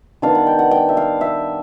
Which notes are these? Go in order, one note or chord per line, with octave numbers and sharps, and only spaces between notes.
D#3 G3 B3 D4 F5
F#5
G5
F#5
G5
E5
F5
E5